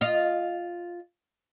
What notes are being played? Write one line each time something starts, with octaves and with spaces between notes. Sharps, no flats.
F4 D#5